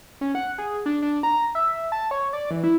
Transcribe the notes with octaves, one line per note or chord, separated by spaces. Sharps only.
C#4
F#5
G#4
D4
D4
A#5
E5
A5
C#5
D5
E3
E4